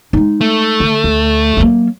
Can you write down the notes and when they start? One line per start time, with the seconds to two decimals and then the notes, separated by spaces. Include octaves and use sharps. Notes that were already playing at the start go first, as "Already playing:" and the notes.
0.13 G#3 D#4
0.41 A3
0.80 D3
1.04 D2
1.57 F#3 A#3